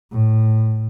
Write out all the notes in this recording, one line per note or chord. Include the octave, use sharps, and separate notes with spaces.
A2